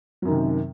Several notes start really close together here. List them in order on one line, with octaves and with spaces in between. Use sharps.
F#3 F#2 D#3 C3